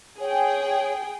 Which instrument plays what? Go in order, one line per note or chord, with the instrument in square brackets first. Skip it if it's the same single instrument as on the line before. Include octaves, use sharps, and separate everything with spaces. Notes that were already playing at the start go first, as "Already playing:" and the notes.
[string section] G#4 G5 [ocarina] C#5